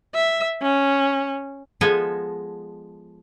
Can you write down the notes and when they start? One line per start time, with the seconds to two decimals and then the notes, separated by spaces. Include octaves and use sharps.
0.14 E5
0.62 C#4
1.81 F3 G#3 B3 A4 D#5 G#5